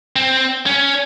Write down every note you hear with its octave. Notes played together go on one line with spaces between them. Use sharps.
C4
C#4